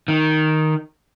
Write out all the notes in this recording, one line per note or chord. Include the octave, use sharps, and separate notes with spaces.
D#3